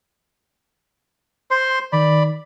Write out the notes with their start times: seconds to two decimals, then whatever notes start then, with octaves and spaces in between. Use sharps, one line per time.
1.51 C5 C6
1.92 D#3 D5 B5